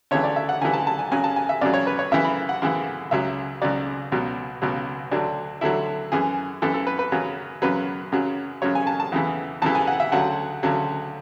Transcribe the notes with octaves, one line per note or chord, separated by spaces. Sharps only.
D2 C#3 E3 C#5
D5
E5
F#5
D2 C#3 E3 G#5
A5
A5
G#5
F#2 C#3 F#3 G#5
A5
G#5
E5
F#2 C#3 F#3 D5
C#5
B4
C#5
F#2 C#3 E3 E5
B5
F#5
F#2 C#3 E3
C#2 C#3 F#3 E5
C#2 C#3 F#3 D5
C#2 B2 F#3
C#2 B2 F#3
D2 D3 F#3 D4
D2 D3 F#3 E4
F#2 E3 G#4
F#2 E3 A4
A4
B4
B4
F#2 C#3 F#3
F#2 C#3 F#3 B4
F#2 C#3 F#3
F#2 C#3 F#3 C#5
G#5
A5
A5
E2 C#3 E3
E2 C#3 E3 A5
G#5
F#5
E5
D2 C#3 F#3 F#5
D2 C#3 F#3